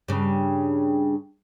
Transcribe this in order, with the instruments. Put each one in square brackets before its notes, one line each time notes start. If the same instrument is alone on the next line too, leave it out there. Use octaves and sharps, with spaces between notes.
[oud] G2 C#3